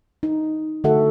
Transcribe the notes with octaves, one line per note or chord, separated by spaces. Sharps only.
D#4
D3 A3 F#4 A4 E5 F#5